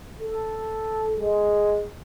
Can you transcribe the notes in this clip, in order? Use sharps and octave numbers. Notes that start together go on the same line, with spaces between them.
A4
G#3